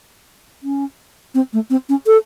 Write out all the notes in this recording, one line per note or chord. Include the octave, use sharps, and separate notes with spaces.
C#4
C4
A3
C4
C#4
A4